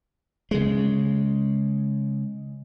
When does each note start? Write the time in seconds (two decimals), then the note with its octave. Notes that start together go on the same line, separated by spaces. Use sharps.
0.51 C#3 G#3